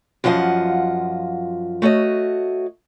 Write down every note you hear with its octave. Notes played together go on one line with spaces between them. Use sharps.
F#2 F3 F4 D#5 F#5
A3 F#4 C#5 D#5